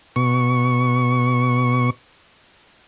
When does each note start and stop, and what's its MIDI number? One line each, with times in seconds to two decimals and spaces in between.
0.16 1.90 47
0.16 1.90 85